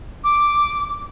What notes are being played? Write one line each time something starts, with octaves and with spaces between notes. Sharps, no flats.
D6